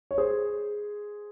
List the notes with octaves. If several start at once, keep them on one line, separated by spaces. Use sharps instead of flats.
C#5
G#4 C5